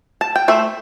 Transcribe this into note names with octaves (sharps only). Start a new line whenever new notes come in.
A5
G5
A3 C5 E5